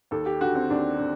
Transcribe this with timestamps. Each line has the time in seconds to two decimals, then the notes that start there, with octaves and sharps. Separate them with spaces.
0.11 D#2 A4
0.26 G4
0.41 D3 F#4
0.55 C4
0.70 D#2 D4
0.99 D3